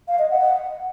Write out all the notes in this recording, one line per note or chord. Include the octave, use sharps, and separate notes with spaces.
F5
D#5
F#5